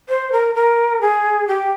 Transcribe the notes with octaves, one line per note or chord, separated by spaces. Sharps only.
C5
A#4
A#4
G#4
G4